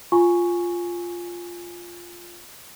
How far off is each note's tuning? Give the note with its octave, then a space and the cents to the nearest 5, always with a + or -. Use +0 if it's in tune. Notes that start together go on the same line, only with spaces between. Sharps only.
F4 +0 G#5 +0 C#6 +0